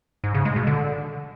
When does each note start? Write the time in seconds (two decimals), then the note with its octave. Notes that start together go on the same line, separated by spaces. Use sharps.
0.24 G#2
0.34 C#3
0.45 G#3
0.56 B2
0.67 D3